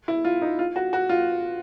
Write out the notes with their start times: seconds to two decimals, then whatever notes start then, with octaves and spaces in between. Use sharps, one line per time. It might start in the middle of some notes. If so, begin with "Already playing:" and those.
0.08 E4
0.25 F4
0.42 D#4
0.59 F4
0.76 F#4
0.93 F#4
1.09 F4